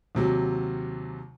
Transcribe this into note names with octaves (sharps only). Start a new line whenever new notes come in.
D#2 C3 F#3